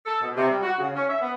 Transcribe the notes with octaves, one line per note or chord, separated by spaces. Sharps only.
A4
B2
C3
G3
F#4
C#3
C#4
E5
B3